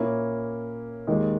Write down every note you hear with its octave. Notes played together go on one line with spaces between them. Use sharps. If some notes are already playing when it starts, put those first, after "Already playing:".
Already playing: A#2 A#3 C#4 E4
D#2 D#3 G#3